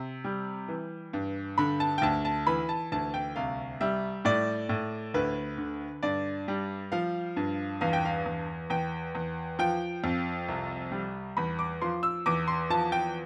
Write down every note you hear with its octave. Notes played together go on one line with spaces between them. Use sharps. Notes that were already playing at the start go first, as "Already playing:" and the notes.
Already playing: C3
G3
E3
G2
D3 B5
A5
G5
D2 A5
A5
E3 B5
A5
D2 A5
G5
C2 F5
G3 E5
A2 D5
A2
D2 B4
D3
G2 D5
G3
F3 F5
G2
E2 F5
G5
F5
E2
E2 G5
E2
F3 G5
F2
C2
G3
E2 B5
D6
F3 C6
E6
E2 D6
C6
F3 A5
G5